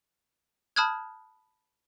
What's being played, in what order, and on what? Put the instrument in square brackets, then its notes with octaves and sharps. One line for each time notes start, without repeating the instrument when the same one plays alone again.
[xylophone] A5 B5 D#6 F6 F#6 G#6